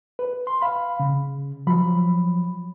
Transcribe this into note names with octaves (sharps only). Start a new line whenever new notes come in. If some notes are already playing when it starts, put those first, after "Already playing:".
B4
C6
F5 B5
C#3
F3 F#3 B5